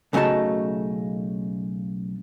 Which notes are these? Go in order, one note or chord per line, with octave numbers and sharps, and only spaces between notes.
B1 C#3 A3 D#4 F#4 A5